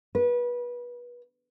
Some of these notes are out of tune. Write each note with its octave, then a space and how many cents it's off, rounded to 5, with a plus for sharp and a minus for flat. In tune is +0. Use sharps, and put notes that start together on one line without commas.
B4 -25